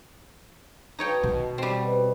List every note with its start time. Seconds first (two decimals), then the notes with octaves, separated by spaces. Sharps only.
0.99 F#2 D#4 B4 C#5 G5 A5
1.23 B2
1.58 G3 C4 F#4 A4
1.80 B3 F#4 D#5